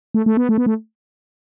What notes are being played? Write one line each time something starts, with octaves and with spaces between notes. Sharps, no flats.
A3
A3
B3
A3
B3
A3